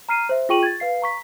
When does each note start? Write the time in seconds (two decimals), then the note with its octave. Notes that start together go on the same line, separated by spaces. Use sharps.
0.09 A#5 F6 C7 D#7
0.29 C5 E5
0.49 F4 G#4 G5 C#6 D#7 F#7
0.63 G#6 A6
0.80 B4 F5 C7
1.02 A#5 C#6 B6